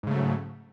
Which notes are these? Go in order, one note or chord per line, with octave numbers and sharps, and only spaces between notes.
G#2 C#3 F#3 A3